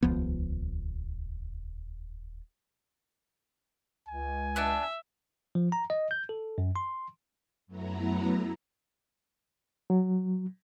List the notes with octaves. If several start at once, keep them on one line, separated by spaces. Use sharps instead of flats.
D#1 C#2 F3 B3
C#2 G#5
B3 D4 E5 A5
F3
A#5
D#5
G6
A4
F#2
C6
F#2 F#3 A3 B3 E4 A#5
F#3